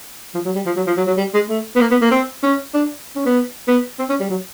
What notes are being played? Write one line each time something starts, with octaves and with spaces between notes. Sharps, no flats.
F3
F#3
G3
F3
F#3
F3
F#3
F#3
G3
G#3
A3
B3
A#3
B3
A#3
C4
C#4
D4
C#4
B3
B3
C4
C#4
G3
F#3